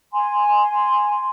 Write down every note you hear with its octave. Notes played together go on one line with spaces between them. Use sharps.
G#5 C6